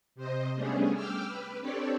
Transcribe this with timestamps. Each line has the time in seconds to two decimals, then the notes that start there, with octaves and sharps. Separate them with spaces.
0.15 C3 C5 D#5
0.56 G3 A3 B3 C#4 D4 G#4
0.93 G5 D6 E6 F6
1.27 B4
1.60 C4 D4 G4 A4 C#5 D5